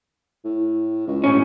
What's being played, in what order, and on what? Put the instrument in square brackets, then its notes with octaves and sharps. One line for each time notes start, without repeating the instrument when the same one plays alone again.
[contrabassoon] A2
C#2
[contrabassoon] E1 [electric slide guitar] A2 C#4